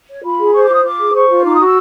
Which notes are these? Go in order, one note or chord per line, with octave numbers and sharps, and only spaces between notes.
C#5
F4 B5
G#4
C5 C#6
D6
F4 D#6
F4 D6
G#4
C5 C#6
F4
D#4 D6
D#6
F#4
E6